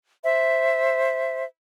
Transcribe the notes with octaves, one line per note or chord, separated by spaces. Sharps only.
C5 E5